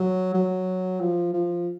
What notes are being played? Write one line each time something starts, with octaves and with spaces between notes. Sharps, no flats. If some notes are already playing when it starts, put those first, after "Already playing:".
Already playing: F#3
F#3
F3
F3